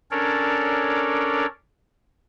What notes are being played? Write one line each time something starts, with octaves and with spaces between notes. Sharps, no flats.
C#4 D4 A4 A#4 C#5 D5